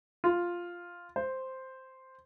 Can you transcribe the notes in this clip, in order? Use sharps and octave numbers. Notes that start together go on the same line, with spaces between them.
F4
C5